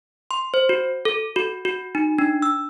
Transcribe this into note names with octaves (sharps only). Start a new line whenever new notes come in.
C6
C5
F#4
A4
F#4
F#4
D#4
D4
E6